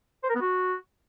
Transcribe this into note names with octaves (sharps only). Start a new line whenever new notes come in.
C5
A#4
B3
F#4